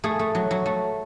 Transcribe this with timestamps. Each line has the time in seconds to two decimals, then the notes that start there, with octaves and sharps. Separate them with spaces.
0.04 A3 G#4
0.19 A3
0.35 F#3
0.51 F#3
0.66 A3